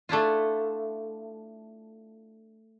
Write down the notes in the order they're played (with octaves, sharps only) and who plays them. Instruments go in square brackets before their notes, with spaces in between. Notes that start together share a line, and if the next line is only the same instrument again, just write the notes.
[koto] A3 D4 E4 F4